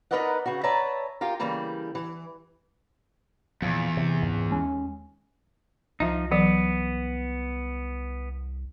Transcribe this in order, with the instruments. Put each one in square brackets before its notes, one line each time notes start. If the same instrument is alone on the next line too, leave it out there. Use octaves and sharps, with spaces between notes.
[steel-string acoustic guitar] D#4 A#4 B4 D5 D#5 F#5
C#3 F#4
B4 C#5 D5 E5 A5 A#5
F4 G4 A#4
C#3 E3 G3 A#3
E3
[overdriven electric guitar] E2 [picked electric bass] A#2 F3
[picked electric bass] C3 E3
C#2 G#2
D#2 G#3 C#4
[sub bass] C2 [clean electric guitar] F3 D#4 [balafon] E5
[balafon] E3 F#3 [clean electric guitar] B3